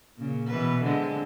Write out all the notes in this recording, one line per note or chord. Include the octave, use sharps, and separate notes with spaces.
A#2 C#3
B2 E3 B4
D3 G#3 C4